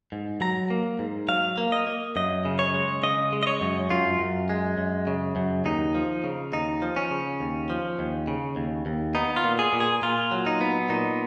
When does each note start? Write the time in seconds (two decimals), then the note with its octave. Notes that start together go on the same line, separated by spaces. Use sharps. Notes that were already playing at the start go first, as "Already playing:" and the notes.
0.12 G#2
0.41 F#3 A#5
0.70 A#3
0.99 G#2
1.28 F#3 F5
1.58 A#3
1.72 D#5
1.87 A#3
2.16 F#2 D#5
2.45 C#3
2.59 C#5
2.74 G#3
3.03 C#3 D#5
3.33 G#3
3.43 D#5
3.47 C#5
3.61 F#2
3.90 F#2 F4
4.19 F#2
4.49 G#3
4.78 F#2
5.07 C#3
5.36 F#2
5.65 D#2 D#4
5.95 F3
6.24 C#3
6.52 D#2 D#4
6.82 F3
6.96 C#4
7.11 C#3
7.40 D#2
7.70 F3
7.99 D#2
8.27 C#3
8.56 D#2
8.86 D#2
9.15 B3 D#4
9.36 F4
9.44 A#2
9.59 G#4
9.73 A#2
9.80 G#4
10.02 A#2 F4
10.31 F#3
10.46 D#4
10.61 B3
10.89 A#2 D#4